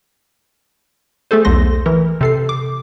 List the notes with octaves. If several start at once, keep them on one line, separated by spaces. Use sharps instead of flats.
A3 G#4 A4 C5
B1 E2 A3 C6 A#6
E3 A#4
C3 A4 C7
D6